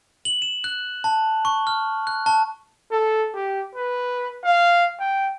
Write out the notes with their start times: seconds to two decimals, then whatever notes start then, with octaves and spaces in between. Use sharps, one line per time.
0.25 F#7
0.42 E7
0.64 F#6
1.04 A5
1.45 C#6
1.67 F6
2.07 F#6
2.26 A5
2.91 A4
3.34 G4
3.75 B4
4.44 F5
5.00 G5